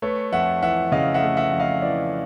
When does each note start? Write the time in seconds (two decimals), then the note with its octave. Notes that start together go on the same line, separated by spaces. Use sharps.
0.02 A3 B4 C#5
0.33 F2 E5 F#5
0.62 E3 E5 F#5
0.92 C#3 D#5 F5
1.14 E5 F#5
1.22 A3
1.37 E5 F#5
1.52 F2
1.60 D#5 F5
1.82 E3 D5 E5